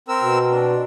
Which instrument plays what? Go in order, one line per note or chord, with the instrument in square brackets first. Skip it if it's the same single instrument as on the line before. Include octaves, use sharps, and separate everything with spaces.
[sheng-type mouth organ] C4 A#4 E6
[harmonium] B2
[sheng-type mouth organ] D4